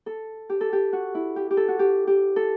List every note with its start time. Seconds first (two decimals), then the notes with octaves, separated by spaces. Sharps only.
0.06 A4
0.49 G4
0.61 A4
0.73 G4
0.93 F#4
1.15 E4
1.36 G4
1.51 G4
1.57 A4
1.68 F#4
1.79 G4
2.07 G4
2.36 A4